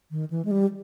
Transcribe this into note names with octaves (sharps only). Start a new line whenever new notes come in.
D#3
E3
G#3
G3